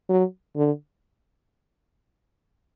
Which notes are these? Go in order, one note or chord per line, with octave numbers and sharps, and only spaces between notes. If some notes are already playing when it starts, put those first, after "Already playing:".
F#3
D3